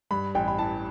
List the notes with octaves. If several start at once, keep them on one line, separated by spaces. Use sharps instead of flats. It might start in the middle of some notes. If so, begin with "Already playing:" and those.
G2 B5
A1 G5
B5
E3 A5